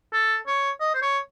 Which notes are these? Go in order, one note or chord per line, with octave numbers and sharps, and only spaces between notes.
A4
C#5
D#5
C5
C#5